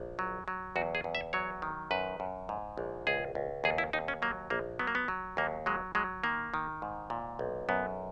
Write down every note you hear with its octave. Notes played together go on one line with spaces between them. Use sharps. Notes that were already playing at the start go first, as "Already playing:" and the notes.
Already playing: A#1
F#3
F#3
E2 F#4
G#4
E2
E5
F#3 C#5
D#3
F#2 B4
F#2
G#2
A#1
C#2 G#4
C#2
D#2 G#4
E4
D#2 D#4
C#4
F#3 A#3
A#1 A#3
F#3 B3
A#3
B3
F#3
D#2 A#3
F#3 G#3
F#3 G#3
D#3 A#3
D#3
G#2
A#2
B1
F#2 B3